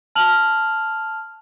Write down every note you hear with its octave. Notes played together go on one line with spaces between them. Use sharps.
A5 F6 F7 F#7